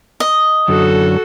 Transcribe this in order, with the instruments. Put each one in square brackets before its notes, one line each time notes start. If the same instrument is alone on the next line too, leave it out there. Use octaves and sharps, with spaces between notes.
[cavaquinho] D#5
[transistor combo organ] F#2 D3 F#3 [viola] F#4 A4